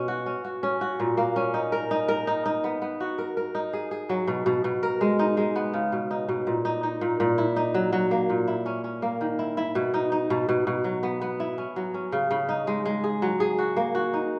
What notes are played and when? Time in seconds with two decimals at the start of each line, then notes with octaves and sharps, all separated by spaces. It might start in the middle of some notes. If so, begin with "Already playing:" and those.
Already playing: B2 C#4
0.08 F#4
0.26 C#4
0.44 F#4
0.63 C#4
0.81 F#4
1.00 A#2
1.17 A#3
1.36 C#4
1.54 D#4
1.72 A#4
1.91 D#4
2.08 A#4
2.27 D#4
2.46 D#4
2.64 B3
2.82 B3
3.00 F#4
3.18 A#4
3.37 A#4
3.55 D#4
3.73 G#4
3.91 G#4
4.09 F#3
4.28 B2
4.46 B2
4.64 B2
4.83 A#4
5.01 G#3
5.19 D#4
5.37 G#3
5.56 B3
5.74 C#3
5.92 B2
6.11 D#4
6.29 B2
6.47 A#2
6.65 D#4
6.83 D#4
7.01 A#2
7.20 A#2
7.38 E4
7.56 D#4
7.74 F#3
7.93 F#3
8.11 A#3
8.30 A#2
8.47 E4
8.66 C#4
8.84 C#4
9.02 A#3
9.21 D#3
9.39 E4
9.57 E4
9.75 B2
9.94 D#4
10.12 D#4
10.30 B2
10.49 B2
10.67 B2
10.84 F#3
11.03 B3
11.21 B3
11.40 E4
11.58 C#4
11.76 F#3
11.94 C#4
12.12 C#3
12.31 C#3
12.49 D#4
12.67 G#3
12.85 G#3
13.04 G#4
13.22 F#3
13.40 G#4
13.58 F#4
13.77 A#3
13.95 F#4
14.13 D#4